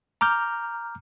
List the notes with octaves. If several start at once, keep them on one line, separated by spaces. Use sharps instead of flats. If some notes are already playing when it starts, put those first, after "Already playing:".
A#5 D6 F6 G6